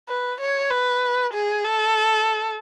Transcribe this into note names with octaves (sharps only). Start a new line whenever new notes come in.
B4
C#5
B4
G#4
A4